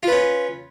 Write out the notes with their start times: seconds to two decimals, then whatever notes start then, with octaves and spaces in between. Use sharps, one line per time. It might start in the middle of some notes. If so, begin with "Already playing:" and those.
0.03 F4
0.07 B4
0.12 C#4